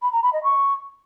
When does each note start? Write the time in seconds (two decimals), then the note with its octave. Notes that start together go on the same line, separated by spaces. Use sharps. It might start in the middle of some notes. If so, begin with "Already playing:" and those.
0.02 B5
0.13 A#5
0.23 B5
0.33 D#5
0.43 C#6